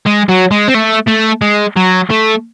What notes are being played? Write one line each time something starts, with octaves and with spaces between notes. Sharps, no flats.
G#3
F#3
G#3
C4
A3
A3
G#3
F#3
A3